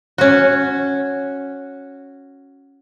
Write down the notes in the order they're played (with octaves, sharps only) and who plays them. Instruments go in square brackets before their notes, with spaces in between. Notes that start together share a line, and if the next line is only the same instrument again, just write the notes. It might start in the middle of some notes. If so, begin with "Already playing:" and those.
[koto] C#4 F#4